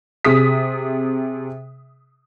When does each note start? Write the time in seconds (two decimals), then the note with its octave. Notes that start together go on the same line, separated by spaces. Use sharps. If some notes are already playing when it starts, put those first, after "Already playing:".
0.25 C3 G#4 D#6 B6